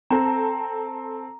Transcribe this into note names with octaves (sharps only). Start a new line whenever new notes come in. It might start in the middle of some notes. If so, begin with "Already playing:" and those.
C4 A4 A#5